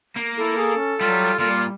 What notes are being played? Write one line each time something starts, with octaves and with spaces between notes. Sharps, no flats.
A#3
E4 A4
G#4
C#4
F#3 G3 F4
A#2 G3 F4